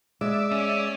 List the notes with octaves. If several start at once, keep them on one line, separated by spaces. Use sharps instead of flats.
G#3 D5 E5
C#4